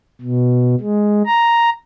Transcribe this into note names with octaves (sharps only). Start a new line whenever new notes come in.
B2
G#3
A#5